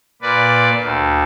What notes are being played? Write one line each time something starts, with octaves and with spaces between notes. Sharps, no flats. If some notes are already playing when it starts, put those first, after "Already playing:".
A#2 B4 D5
D2